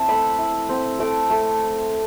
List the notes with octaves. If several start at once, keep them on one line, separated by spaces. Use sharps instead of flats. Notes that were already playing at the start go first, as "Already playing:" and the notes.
Already playing: C4 E4 A5
A3 B5
E4
C4
A3 D6
A3